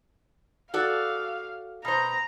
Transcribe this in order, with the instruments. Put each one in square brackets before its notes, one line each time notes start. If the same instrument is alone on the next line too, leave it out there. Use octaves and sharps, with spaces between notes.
[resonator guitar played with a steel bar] F#4 A4 D5 [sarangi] F5
[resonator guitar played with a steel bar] B2 C5 [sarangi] A#5